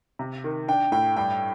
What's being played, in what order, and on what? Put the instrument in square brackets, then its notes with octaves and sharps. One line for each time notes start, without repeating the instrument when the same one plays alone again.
[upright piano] C3
D#3
[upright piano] D4 [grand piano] G5
[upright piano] A2 [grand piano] G5
[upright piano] G2 [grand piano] G5